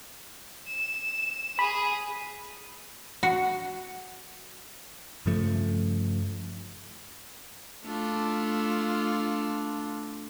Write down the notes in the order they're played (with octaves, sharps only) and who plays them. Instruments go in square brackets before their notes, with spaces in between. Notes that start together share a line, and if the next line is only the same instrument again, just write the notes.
[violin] E7
[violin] G#4 [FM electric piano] B5
[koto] F#4
[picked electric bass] G2 C#3 F3 A3
[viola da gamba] A3 D4 F4